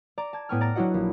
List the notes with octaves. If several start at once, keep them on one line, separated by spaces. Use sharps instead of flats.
D5 A#5
A5 G#6
A2 B3 G5 G#5 C#6 F6
D5 A#5 A6 A#6
F#3 D4 E4 F#4 D#5 F#5
A#1